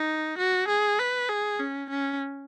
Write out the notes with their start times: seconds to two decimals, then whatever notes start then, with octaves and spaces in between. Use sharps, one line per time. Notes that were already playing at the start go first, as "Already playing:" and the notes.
Already playing: D#4
0.39 F#4
0.69 G#4
1.00 B4
1.29 G#4
1.60 C#4
1.90 C#4